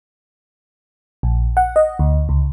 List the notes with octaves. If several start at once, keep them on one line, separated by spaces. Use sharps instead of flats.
A#1
F#5
D#5
D2
C#2